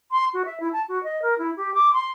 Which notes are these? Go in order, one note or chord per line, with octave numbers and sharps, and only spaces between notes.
C6
F#4
E5
E4
A5
F#4
D#5
A#4
E4
G4
D6
C6